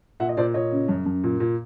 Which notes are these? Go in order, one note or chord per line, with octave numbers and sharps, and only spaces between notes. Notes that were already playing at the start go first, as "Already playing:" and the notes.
A#2 E5 F#5
D#5
A#2 C5 D5
A#2 C#5 D#5
C#3
F#2
F#2
A#2
A#2